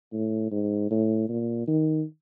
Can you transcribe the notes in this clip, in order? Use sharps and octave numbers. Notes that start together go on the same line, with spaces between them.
A2
G#2
A2
A#2
D#3